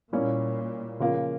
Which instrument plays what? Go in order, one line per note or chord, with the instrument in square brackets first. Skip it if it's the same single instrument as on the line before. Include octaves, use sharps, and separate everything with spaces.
[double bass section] A#2 [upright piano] G3 A#3 C#4 E4
[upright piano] C#3 F3 A#3 F4